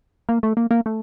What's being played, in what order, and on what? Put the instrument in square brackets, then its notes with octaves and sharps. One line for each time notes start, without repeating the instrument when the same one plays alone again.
[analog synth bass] A#3
A3
A#3
A#3
A3